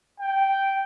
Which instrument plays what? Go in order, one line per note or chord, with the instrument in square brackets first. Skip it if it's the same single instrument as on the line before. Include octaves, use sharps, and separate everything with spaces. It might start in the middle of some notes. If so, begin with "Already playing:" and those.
[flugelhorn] G5